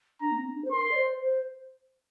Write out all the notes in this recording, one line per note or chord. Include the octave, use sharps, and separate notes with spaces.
D4 A#5
A#3
C4
D4
C5
A#4 C6
D5
C5
C5